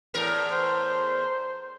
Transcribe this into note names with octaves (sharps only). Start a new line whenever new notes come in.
E2 A2 A#4
C5